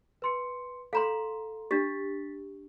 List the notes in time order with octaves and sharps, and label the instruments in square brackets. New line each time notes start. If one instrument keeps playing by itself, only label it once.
[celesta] B4 C6 C#7
[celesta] A4 [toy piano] F5 A#5 C6
[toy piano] D4 G4 [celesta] A6 B6